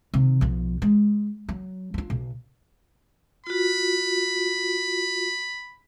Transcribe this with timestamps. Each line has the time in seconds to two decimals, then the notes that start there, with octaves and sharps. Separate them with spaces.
0.14 C3 D#3
0.41 B1 F3
0.82 G#3
1.49 F#3
1.94 D4 F4
2.10 B1
3.47 F4 F#4 B5